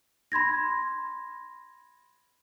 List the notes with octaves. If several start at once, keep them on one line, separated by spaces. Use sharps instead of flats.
B5 C6 G#6 A#6